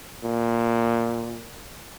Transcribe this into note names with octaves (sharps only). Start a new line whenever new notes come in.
A#2